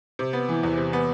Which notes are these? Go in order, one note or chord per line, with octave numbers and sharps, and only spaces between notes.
C3
B3
E3
E2
C3
B3